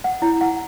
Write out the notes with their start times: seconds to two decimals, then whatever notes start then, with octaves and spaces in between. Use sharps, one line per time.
0.04 F#5
0.22 E4
0.41 F#5